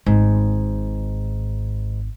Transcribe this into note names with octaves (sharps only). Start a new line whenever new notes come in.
G#1 G#2